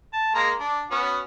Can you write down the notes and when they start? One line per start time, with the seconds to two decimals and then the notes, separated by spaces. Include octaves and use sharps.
0.13 A5
0.35 G#3 A#3 A#5
0.60 D4
0.91 B3 C#4 F#4